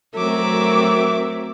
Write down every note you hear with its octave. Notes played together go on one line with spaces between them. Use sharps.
F#3 A3 C4 A#4 E5 D6